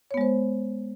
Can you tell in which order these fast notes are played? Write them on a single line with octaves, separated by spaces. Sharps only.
C#5 B3 G#3 C5